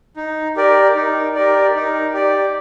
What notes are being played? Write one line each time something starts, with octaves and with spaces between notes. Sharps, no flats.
D#4
G4 A#4 D5
D#4
G4 A#4 D5
D#4
G4 D5